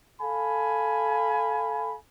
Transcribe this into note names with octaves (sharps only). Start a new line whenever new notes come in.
A4 F5 G#5 B5